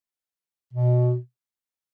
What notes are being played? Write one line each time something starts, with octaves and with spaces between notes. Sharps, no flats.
B2